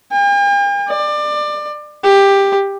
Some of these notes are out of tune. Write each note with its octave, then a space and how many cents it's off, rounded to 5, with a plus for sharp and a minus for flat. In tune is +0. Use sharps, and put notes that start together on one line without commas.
G5 +45
D5 +25
G4 +10